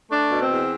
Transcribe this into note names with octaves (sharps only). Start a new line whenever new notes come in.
A3 D4
B2
C4
E2